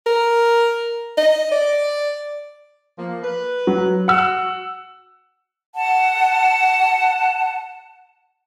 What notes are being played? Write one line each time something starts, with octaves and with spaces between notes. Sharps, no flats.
A#4
D#5
D5
F3 A#3
B4
F#3
F#4 F#5 E6
F#5 A5